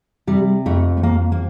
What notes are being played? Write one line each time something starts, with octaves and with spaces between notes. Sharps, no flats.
C3 G3
F2 A3
A3
F2 A#3
A#3